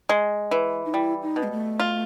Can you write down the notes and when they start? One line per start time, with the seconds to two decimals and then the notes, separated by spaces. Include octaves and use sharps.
0.09 G#3
0.51 E3
0.86 D#4
0.94 G3 E4
1.22 D#4
1.36 B2
1.43 G#3
1.51 A3
1.80 F4